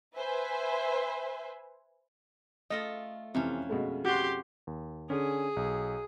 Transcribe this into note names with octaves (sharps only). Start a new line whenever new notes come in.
B4 C5 E5 G#5
A3 F4 A4 D#5
F2 C3 E3 C#4
B2 G#3 A3
F#4 G4 C6
D#2
D3 C#4 G#4
B1